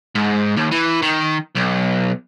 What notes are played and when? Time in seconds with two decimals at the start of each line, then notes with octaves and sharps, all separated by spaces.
0.15 G#2
0.56 D#2
0.71 E3
1.02 D#3
1.56 B1